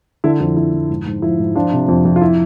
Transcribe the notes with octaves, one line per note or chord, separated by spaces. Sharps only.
D3 E4
F2 E4
F2 E4
F2
G#2
G#2
F3 E4
G#2
F3 D4 F4
C3
F2
F2
F4
E4